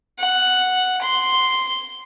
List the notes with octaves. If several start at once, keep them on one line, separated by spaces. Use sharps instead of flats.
F#5
C6